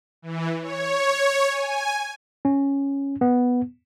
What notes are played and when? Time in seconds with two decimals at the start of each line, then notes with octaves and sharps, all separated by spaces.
0.22 E3
0.61 C#5
1.50 G#5
2.45 C#4
3.21 B3